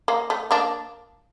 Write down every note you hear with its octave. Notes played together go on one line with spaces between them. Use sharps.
A#3
A3
A#3 D4